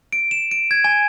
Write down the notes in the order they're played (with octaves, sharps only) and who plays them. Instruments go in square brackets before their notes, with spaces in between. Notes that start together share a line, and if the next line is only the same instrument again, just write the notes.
[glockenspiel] D7
E7
D7
G#6
G#5